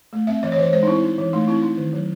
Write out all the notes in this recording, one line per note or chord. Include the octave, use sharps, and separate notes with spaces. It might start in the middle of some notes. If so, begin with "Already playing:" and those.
A3
C4 E5
E3 D#5
C#5
E3 C5
C#5
G#3 C5
D#4
C4 E4
D#4
E3
A3 D#4
C4 E4
D#4
D#3
F#3